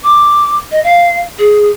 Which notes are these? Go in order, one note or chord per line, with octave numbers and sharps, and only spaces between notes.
D6
D#5
F5
G#4